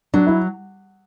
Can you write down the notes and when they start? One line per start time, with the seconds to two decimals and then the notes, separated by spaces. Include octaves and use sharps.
0.14 F#3 D4
0.27 E4